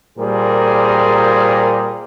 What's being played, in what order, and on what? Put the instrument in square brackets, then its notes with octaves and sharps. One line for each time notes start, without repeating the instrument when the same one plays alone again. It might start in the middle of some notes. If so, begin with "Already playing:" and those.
[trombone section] A#2 G3 G4 G#4 A#4 C5